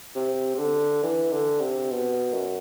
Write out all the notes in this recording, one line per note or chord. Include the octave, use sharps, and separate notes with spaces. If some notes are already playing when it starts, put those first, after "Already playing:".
C3
C3
D3
E3
D3
C3
B2
F#2